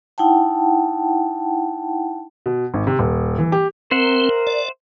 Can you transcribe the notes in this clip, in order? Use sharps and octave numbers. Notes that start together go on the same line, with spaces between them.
D#4 E4 F#5 G5 A5
B2
G#1
C3
D#1
E3
G4
C4 A#4 C5 E5 F#5
D5